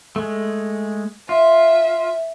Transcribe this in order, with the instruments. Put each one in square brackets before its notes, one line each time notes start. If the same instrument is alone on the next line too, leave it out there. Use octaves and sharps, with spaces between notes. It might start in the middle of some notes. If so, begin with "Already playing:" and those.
[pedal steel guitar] G#3 A3
[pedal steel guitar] F4 [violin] E5